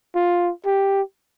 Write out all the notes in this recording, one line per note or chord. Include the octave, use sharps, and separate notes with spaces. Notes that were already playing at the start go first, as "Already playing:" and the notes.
F4
G4